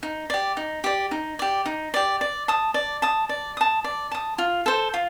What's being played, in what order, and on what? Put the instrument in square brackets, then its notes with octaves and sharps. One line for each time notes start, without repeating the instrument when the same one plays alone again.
[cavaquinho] D#4
G4 D5
D#4
G4 D5
D#4
G4 D5
D#4
G4 D5
D5
A5 D#6
D5
A5 D#6
D5
A5 D#6
D5
A5 D#6
F4
A4 C5
F4